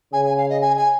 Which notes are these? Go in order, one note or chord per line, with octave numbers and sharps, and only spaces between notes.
C#3 G#5
G#5
F5
D#5
G#5
G#5